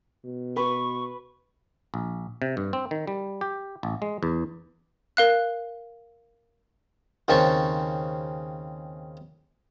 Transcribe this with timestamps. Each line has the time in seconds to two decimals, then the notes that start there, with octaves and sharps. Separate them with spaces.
0.25 B2
0.57 B4 C#6
1.94 A#1
2.42 C3
2.57 G2
2.73 C4
2.91 D#3
3.07 G3
3.41 G4
3.83 A1
4.02 G#3
4.23 E2
5.17 A#4 F5 F#6
7.28 D#2 C#3 C4 A5 C#6